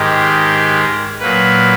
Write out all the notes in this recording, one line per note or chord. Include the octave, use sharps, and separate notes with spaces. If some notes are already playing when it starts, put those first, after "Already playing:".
Already playing: G#2 D#3 G#3 G4
A#2 F#3 A#3 B4